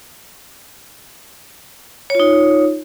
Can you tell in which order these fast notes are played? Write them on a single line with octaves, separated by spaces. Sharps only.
C#5 F4 D#4